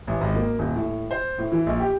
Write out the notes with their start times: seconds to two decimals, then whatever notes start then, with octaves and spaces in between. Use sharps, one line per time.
0.07 A1
0.21 G#1
0.35 A#3
0.59 D#1
0.76 A2
1.11 C5
1.38 A2
1.52 E3
1.66 A#1
1.80 G4